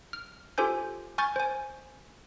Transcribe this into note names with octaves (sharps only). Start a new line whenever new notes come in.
F6
F4 G4 A4 C5 G#5 G6
G#5 C#6 F6 G6 A6
C5 G#5